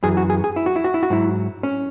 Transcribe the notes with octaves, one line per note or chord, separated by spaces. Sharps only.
F#2 E3 G#4
F#4
G#4
G#4
E4
F#4
E4
F#4
E4
F#4
G#2 F#3 E4
C#4